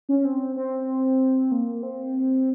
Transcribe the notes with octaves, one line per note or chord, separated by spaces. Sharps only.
C#4
C4
C4
A#3
C4